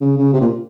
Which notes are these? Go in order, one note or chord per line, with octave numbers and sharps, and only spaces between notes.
C#3
C#3
C3
A#2